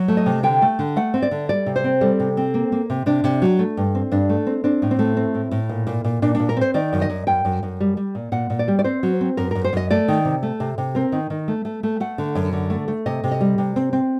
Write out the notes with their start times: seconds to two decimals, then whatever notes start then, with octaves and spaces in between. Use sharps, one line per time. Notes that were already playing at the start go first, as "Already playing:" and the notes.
Already playing: F#3
0.08 A3
0.17 D#5
0.26 C3
0.43 D3 G5
0.62 A3
0.79 D3
0.96 A3 F#5
1.14 C4
1.22 D5
1.31 D3
1.49 G3 D5
1.66 C3
1.76 C5
1.84 C4
2.01 G3 A4
2.20 C3
2.37 C4
2.54 A#3
2.72 A#3
2.90 C3
3.06 C3 D4
3.24 C3
3.42 F#3
3.59 A3
3.77 G2
3.95 C4
4.12 G2 D4
4.29 A3
4.47 C4
4.64 C4 D4
4.82 A2
4.91 C4
4.99 A3
5.17 C4
5.34 A2
5.51 A2
5.69 A#2
5.87 A#2
6.04 A#2
6.22 A#2 D4
6.35 A#2 D4
6.49 A#4
6.57 C4 C5
6.74 D#3 D5
6.93 F#2
7.02 D#5
7.10 F#2
7.27 F#2 G5
7.45 F#2
7.63 F#2
7.80 G3
7.97 G3
8.15 A#2
8.32 A#2 F#5
8.50 A#2
8.59 D5
8.68 G3
8.79 D5
8.84 C4 C5
9.03 F#3
9.21 C4
9.37 F#2 A#4
9.51 F#2 A#4
9.64 C5
9.73 F#2 D#5
9.91 A3 D5
10.08 D#3
10.25 C3
10.43 A3
10.60 C3
10.78 C3
10.95 C4 A#4
11.12 D#3
11.30 D#3
11.48 A3
11.65 A3
11.83 A3
12.00 A3 F#5
12.18 D3
12.35 F#2
12.53 D3
12.70 A3
12.88 A3
13.06 C3 D#5
13.24 C3
13.31 D#5
13.40 G3
13.58 C3
13.76 C4
13.93 C4